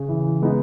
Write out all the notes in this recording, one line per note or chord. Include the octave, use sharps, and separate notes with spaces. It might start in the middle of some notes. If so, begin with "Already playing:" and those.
Already playing: C#3
E3
G#3 B3 D#4